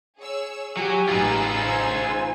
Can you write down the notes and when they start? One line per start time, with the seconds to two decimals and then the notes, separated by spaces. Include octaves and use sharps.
0.19 G#4 C#5 E6
0.77 F#3 G4 G#5
1.09 A1 D#4 F4 G#4 B4 E6
1.64 C5 G#5